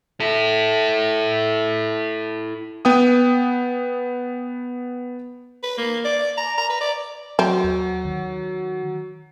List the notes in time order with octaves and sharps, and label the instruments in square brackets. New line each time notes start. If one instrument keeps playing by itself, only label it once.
[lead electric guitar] E4 A4
[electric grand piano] B3 G5 D#6
[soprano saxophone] B4
A#3
D5
A#5
A#5
B4
D5
[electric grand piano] F#3 [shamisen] C4
[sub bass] D#2
D#3